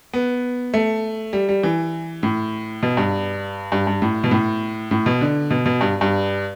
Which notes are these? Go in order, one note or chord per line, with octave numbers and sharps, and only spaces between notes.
B3
A3
G3
G3
E3
A2
B2
G2
G2
G2
A2
B2
A2
A2
B2
D3
B2
B2
G2
G2